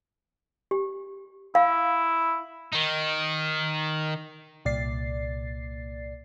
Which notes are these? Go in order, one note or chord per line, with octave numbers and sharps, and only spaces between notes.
G4
E4 F5
D#3 D#4
C2 A#2 D5 A6 C7